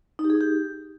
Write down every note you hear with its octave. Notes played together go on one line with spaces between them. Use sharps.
D#4
G4
G#4
D#4
G4